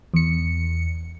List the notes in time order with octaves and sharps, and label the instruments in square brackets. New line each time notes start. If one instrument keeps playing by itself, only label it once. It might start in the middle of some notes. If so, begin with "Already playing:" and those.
[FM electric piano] E2 C#7